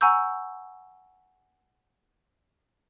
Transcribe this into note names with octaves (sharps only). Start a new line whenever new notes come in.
F#5 G#5 A#5 C#6 E6 G6